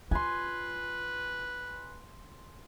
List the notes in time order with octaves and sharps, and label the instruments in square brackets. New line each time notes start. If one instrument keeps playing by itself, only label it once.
[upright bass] F4 [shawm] B4 [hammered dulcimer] G#5 C6